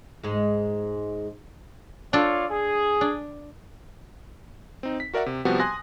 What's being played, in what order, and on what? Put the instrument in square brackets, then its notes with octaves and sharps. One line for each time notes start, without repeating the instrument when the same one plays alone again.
[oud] G#2 G#3
[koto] D4 A4 [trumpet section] F4 C#5 D5
[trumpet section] G#4
[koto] D4
[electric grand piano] C4 D#4
B6
F#4 A#4 D5 E5 F#5
C3
C3 F3 G3 B3 F#4
G#5 C6 D#6 F#6 A#6